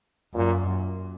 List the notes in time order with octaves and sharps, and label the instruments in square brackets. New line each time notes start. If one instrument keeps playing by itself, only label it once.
[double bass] F#2 [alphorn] A#2